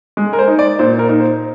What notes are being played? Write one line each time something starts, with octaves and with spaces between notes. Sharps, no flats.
G#3
A#4
C5
D#4
D5
A#2 C5
A#4
D#4
C5